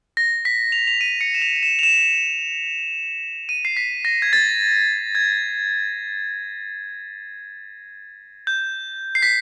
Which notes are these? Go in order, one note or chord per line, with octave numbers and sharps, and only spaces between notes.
A#6
B6
F7
F7
D#7
C#7
E7
F7
E7
F7
E7
D#7
C7
B6
A#6
G#6
A6
G#6
G6
C7
B6